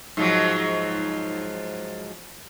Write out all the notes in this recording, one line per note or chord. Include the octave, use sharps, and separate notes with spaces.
G#2 F3 F#3